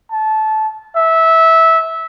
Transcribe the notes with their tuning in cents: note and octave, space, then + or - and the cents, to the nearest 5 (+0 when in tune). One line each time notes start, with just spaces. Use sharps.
A5 -20
E5 -15